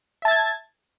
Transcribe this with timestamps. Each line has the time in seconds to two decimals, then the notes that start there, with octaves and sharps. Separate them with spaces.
0.22 E5
0.25 A5
0.28 A6
0.31 G#6